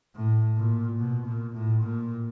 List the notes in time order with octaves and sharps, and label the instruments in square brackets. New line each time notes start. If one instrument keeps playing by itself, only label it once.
[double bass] A2
A#2
B2
A#2
A2
A#2